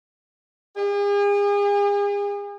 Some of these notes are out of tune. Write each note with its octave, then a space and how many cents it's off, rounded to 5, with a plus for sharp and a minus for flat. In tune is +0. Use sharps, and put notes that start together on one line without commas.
G#4 -40